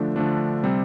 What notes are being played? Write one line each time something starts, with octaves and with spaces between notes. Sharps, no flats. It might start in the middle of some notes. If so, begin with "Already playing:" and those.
Already playing: D3 F3 A3 D4
D3 F3 A3 D4
C3 G3 C4